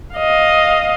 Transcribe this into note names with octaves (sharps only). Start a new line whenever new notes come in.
D#5 F5